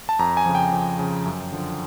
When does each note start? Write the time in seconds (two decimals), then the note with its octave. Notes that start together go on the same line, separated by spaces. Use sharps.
0.09 A5
0.19 F2 A#5
0.37 G#5
0.46 C#3 F3
0.55 G5
0.72 F2
0.99 C#3 F3
1.25 F#2
1.52 D3 F3